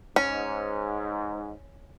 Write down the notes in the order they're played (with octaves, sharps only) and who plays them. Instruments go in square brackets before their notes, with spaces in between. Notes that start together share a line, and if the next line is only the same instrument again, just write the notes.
[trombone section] G#2 [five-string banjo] C#4